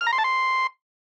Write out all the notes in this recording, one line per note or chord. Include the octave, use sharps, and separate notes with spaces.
F6
A#5
C6
A5
C6